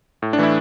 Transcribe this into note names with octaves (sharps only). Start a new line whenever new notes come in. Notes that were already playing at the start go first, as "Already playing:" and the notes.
A2
D4
E3 A3 E4